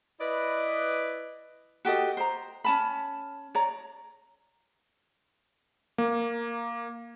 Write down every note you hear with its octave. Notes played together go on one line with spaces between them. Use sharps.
E4 B4 D5 D#5
F#4 G4 A4 D#5
C5 A#5
C#4 A5 B5
C#5 D5 A#5
A#3